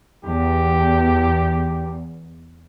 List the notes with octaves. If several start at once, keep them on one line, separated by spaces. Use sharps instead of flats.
E2 G4